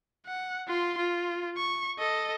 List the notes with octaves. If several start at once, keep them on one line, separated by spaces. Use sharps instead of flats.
F#5
F4 C6
F4
C#6
A4 D#5